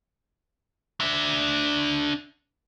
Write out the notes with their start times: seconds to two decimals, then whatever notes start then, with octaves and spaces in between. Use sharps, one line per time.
1.00 D4 E5